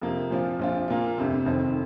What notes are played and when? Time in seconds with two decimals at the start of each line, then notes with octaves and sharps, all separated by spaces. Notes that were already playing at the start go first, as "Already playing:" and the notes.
0.01 F2 C3 F3 A#3
0.30 A#2 F3 C4 F4
0.59 A#1 A#2 F3 C4 F4
0.88 A#2 A#3 F4
1.18 G1 F2 C3
1.45 F1 F2 D#3 C4